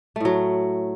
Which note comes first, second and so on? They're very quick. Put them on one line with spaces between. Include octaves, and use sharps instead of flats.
A3 A2 F#3